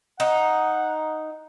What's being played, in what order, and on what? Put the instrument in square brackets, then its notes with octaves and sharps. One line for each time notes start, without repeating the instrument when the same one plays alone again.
[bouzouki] D#4 [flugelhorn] F#5